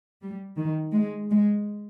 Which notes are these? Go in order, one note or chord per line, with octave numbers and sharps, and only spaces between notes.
G3
D#3
G#3
G#3